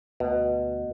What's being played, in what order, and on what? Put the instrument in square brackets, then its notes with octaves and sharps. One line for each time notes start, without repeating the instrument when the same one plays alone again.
[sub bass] D2 [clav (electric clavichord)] B2